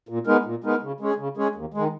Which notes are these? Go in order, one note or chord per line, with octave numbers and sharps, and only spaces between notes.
A#2
G#3 B3 D#4 A#4
A#2
G#3 B3 D#4 A#4
C#3
G#3 C#4 G#4
C#3
G#3 C#4 G#4
D#2
D#3 G#3